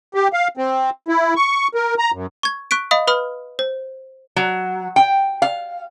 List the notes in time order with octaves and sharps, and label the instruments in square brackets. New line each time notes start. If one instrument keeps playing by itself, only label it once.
[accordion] G4
F5
C4
E4
C#6
A#4
A#5
F#2
[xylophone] C#6 G#6
C#6 F#6 B6 D7
D#5 F5 B5 D#6
B4 B5 D#6 F6
C5
[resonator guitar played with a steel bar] F#3
G5
F5